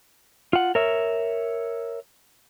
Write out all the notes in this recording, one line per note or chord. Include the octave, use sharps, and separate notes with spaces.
F4 F#5
A#4 C#5 E5